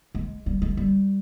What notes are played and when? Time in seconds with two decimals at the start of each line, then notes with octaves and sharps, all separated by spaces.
0.15 G#3
0.46 G3
0.62 G#3
0.77 G3